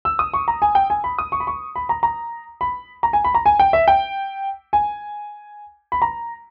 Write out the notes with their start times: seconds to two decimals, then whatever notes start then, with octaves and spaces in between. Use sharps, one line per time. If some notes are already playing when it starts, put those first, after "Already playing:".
0.05 E6
0.19 D#6
0.34 C#6
0.48 A#5
0.62 G#5
0.75 G5
0.90 G#5
1.04 B5
1.19 D#6
1.32 C#6
1.40 B5
1.47 C#6
1.76 B5
1.89 A#5
2.03 A#5
2.61 B5
3.03 A#5
3.13 G#5
3.24 B5
3.35 A#5
3.46 G#5
3.59 G5
3.73 E5
3.88 G5
4.73 G#5
5.92 B5
6.02 A#5